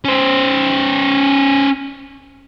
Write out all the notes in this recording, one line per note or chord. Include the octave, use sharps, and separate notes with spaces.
C#4 C5